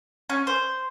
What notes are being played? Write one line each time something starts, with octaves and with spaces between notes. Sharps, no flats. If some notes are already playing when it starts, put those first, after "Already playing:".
C#4
C5